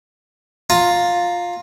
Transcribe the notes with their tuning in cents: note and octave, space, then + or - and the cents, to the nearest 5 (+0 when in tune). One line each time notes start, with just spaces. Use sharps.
F4 +10 A#5 -15